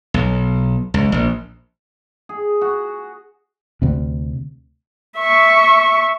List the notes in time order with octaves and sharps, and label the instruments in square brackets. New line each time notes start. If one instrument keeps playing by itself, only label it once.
[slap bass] B1
C#2
A#1
[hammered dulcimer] G#4
F#4
[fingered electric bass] D2 C3
[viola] E5 C#6